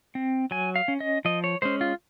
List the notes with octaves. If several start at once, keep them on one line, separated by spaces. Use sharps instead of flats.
C4
F#3 G#5
F5
C#4
D#5
F3 D#5
C#5
G#3 C#4 C5
F4